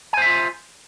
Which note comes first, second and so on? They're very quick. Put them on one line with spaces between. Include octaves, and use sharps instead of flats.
G#5 C5 E5 F4